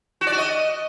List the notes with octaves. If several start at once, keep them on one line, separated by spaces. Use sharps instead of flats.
F#4
D5
F#4
D#5